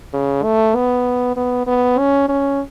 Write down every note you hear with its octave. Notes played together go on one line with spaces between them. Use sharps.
C#3
A3
B3
B3
B3
C#4
C#4